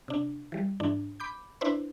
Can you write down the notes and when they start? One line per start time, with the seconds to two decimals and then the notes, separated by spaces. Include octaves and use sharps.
0.08 C3 D4
0.52 E3 G3
0.80 G#2 E3 D4
1.20 B5 D6 G6
1.61 D4 E4 B4 C5